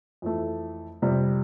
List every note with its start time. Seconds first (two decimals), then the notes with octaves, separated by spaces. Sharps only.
0.22 F2 E3 A3
1.02 F2 C3 G3